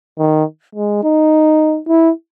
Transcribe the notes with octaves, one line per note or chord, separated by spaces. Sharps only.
D#3
G#3
D#4
E4